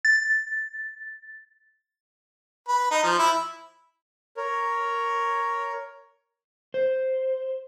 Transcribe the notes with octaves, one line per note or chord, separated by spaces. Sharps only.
A6
B4
D#4
F3
E4
A#4 C#5
C5